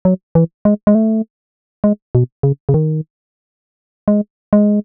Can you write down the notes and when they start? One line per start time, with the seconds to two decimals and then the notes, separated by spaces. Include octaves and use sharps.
0.05 F#3
0.35 E3
0.65 G#3
0.87 G#3
0.95 A3
1.84 G#3
2.15 B2
2.43 C#3
2.69 C#3
2.74 D#3
4.08 G#3
4.53 G#3